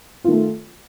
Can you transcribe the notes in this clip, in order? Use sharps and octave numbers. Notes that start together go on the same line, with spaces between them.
D#3 A3 F4